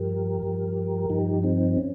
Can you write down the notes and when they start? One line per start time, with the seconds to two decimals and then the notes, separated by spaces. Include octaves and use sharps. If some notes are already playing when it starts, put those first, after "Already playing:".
Already playing: G2 F3 G4 A#4
0.42 G2 F3
1.09 G2 F3 D#4 G4
1.43 C4 D#4
1.77 C#4